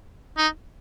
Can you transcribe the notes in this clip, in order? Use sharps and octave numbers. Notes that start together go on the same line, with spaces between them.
D#4